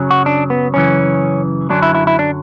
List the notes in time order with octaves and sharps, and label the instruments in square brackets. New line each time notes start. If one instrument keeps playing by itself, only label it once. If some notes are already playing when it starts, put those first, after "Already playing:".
Already playing: [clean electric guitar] F#2 C#3 F#3
F#4
D4
B3
F#2 C#3 E3 C#4
F#2 D3 F#3 D4
E4
E4
E4
D4